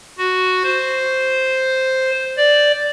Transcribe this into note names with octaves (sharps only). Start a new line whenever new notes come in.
F#4
C5
D5